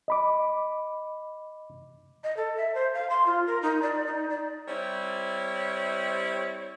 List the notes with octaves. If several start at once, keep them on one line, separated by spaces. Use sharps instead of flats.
D#5 B5 D6
D#5
A4
E5
C5
F5
C6
F4
A#4
D#4
D5
D#4
D5
G3 C4 E4 C#5 D5